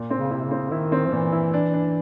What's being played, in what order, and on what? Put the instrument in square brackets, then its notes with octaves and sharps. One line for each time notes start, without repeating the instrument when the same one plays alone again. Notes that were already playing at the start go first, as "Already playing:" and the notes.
Already playing: [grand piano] A#2
C4
[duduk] C#3
[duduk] C3 [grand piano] E4
[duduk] C#3
[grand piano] C4
[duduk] D#3 [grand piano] E4
[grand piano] C4
[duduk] F3
[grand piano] A#2 [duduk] E3
[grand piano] E4
D4
D4